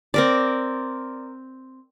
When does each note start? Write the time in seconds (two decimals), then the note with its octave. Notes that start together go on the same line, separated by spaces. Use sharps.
0.14 C4 A#4 D5